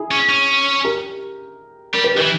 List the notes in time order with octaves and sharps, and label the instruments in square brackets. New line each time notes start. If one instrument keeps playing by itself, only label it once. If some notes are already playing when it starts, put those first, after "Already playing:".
Already playing: [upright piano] E4 G#4
[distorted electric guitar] C#4
C#4
[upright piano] G4 A#4
[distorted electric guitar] G3 [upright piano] A#4
[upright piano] B4
[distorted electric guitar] D#3 [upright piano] G4 A#4
[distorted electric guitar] E3